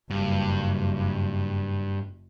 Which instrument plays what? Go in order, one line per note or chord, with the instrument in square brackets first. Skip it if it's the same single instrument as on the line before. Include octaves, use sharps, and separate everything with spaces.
[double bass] F#1 [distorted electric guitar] G2